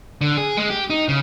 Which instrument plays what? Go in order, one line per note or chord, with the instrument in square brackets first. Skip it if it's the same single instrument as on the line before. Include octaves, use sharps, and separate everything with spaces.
[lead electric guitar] D3
G#4
G#3
G4
D#4
C#3